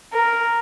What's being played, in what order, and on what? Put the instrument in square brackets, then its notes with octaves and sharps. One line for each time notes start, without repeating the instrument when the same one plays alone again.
[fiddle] A#4